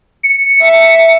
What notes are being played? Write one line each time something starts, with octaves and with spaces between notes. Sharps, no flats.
C#7
E5